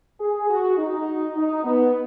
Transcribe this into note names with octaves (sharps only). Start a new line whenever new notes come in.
G#4
F#4
D#4
D#4
B3